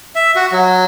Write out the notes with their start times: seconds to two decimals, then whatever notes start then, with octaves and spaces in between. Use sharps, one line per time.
0.15 E5
0.36 F#4
0.52 F#3